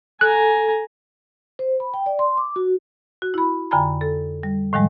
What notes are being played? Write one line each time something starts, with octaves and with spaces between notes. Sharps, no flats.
A4 G#5 A#5 F#6
C5
B5
G5
D5
C6
D6
F#4
F#4
E4 B5
F2 D3 G5 G#5 A#5 B5
A4
G3
A2 D#3 F3 G3 G#3